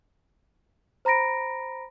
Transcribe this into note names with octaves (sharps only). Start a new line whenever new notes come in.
C5 A#5 B5 A#6 D7